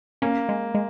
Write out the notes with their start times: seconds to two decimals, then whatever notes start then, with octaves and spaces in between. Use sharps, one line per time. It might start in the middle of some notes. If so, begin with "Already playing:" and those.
0.22 A#3 C#4
0.49 G#3
0.75 G#3